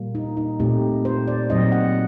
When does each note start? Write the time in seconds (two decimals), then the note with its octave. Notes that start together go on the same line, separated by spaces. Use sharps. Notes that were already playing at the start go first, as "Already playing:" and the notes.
Already playing: A#2 G3 A#3
0.15 D#4
0.37 D#4
0.60 A#2 A3 C4 D#4 G4
1.05 C5
1.28 D5
1.49 A#2 F#3 C4 D#4 D#5
1.72 F#5